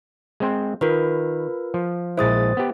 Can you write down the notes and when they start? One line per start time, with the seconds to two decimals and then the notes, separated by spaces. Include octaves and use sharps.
0.40 G#3 C4 C5
0.81 D#3 F4 A#4 B4
1.74 F3
2.17 A#1 G#3 E4 C5 D#6 A6
2.57 B3 G4